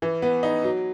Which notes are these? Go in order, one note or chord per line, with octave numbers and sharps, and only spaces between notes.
E3
B3
D#4
F#3